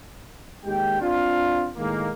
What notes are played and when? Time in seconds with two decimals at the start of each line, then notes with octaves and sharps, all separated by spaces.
0.65 D#2 G#3 G4 G5
1.01 C4 D4 F4
1.77 A2 D#3 G#3 A#3